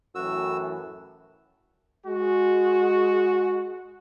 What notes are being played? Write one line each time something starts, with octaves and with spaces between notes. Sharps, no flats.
F#2 A2 E3 F#4 E6
G#3 F#4